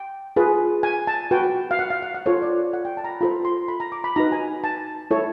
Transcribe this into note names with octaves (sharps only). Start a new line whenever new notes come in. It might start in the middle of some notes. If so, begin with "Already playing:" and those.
Already playing: G5
F4 G#4 B4
G#5
A5
F#4 B4 G5
F5
F#5
F5
F#5
F#5
F4 A4 C5 C#5
D5
F#5
G5
A5
A#5
B5
F4 A4 C5 B5
C6
B5
A#5
D6
B5
D#4 F#4 B4 A#5
G#5
A5
E4 A4 C#5